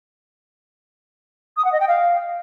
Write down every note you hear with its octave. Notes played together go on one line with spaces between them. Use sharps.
D#6
F#5
D#5
G5
F5